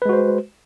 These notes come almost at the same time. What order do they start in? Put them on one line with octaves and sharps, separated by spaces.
B4 G#3 F#4 C5